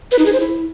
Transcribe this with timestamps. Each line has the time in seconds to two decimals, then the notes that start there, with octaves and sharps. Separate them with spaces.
0.11 B4
0.19 D#4
0.26 G#4
0.33 C5
0.40 E4